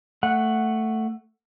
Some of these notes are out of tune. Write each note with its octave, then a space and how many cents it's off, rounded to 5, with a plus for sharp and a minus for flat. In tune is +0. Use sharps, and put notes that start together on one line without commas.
A3 +10 F#5 +5